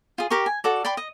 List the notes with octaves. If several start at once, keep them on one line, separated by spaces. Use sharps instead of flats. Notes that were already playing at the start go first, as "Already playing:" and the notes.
F4 G#4
G4 A#4 G5 C#6
G#5
F#4 A4 D5
D5 G5 B5 C6
D#5